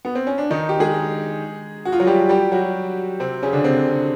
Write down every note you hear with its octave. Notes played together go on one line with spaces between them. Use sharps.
B3
C4
C#4
D4
D#3 D#4
G4
G#3 G#4
F#4
F4
F#3 F#4
G3 G4
G3 G4
F#3 F#4
C3 C4
C#3 C#4
D3 D4
C3 C4